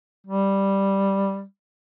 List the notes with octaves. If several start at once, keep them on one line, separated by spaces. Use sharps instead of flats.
G3